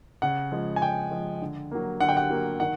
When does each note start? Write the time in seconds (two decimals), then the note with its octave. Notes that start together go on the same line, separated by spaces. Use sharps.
0.22 C#3 F#5
0.52 F3 G#3
0.76 G#5
0.82 C#3 G5
1.11 F3 G#3
1.42 D3
1.71 F#3 A#3
2.00 D3 F#5
2.09 G5
2.17 F#5
2.30 F#3 A#3
2.60 D#3 F#5